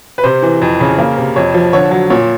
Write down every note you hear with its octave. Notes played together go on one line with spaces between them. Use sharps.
B4
C3 C5
E3
F2
C#3
A#3
C3
F2 C#5
F3
D3 C#5
F#3
A#2 C#5